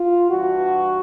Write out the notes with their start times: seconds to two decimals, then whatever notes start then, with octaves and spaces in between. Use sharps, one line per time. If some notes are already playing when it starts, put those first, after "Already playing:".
Already playing: F4
0.30 G2 E3 F#4